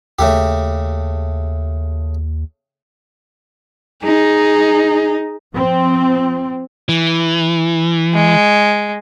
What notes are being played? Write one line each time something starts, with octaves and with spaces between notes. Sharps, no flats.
D#2 C#3 A3 G4
D#4 G#4
F3 C4
E3
G#3